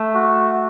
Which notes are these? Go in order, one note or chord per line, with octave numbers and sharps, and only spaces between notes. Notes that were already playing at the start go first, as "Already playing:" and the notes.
Already playing: A3
F#4